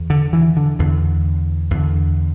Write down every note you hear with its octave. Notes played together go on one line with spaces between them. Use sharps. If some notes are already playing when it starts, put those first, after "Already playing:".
Already playing: E2
D3
E3
D3
E2 D3
E2 D3